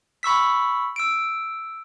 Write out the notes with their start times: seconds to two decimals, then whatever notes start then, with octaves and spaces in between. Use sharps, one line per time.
0.23 B5 C#6 E6 B6
0.96 E6 D7